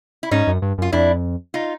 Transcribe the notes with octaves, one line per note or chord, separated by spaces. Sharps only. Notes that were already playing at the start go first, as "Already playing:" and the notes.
E4
G#2 C#4 D#4
F#2
G2
F#2 F4
F2 D4 E4
D#4 F4